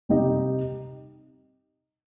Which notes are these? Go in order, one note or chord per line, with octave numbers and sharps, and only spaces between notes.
C3 G3 D#4 G4 D#5